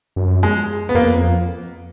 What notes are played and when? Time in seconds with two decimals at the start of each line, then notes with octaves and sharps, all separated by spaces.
0.16 F#2
0.43 G#3
0.89 B3
0.95 F2 A#3